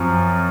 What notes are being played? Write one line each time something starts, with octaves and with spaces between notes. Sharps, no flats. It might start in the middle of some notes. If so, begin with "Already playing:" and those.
Already playing: F#2 F3 C4